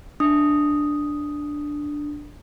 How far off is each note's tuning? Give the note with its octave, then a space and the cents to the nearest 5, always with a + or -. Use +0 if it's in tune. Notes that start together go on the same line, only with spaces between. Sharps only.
D4 +0 D#6 +0